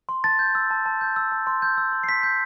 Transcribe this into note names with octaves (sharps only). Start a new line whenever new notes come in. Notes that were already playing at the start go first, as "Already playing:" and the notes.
C6
A5 A6
G6
E6
A5
A5
G6
E6
A5
C6
G6
E6
C6
C7
C6 B6
G6